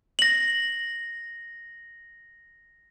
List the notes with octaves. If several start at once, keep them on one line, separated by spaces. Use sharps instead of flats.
A#6 F#7